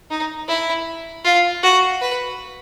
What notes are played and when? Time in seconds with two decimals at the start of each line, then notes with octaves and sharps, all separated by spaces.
0.10 D#4
0.48 E4
1.25 F4
1.63 F#4
2.01 B4